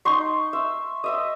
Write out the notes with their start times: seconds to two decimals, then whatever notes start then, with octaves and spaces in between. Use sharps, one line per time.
0.05 D#4 C6 C#6
0.53 E5
1.04 D#5 E5 D#6